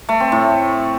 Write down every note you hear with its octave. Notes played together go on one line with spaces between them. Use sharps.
A3
C4
A2